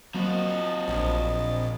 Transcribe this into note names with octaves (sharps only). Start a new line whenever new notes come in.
F3 F#3 A#3 C4 F#4 D#5 A6
A#1